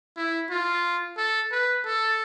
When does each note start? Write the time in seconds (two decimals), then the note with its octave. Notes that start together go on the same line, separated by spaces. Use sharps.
0.16 E4
0.50 F4
1.17 A4
1.52 B4
1.85 A4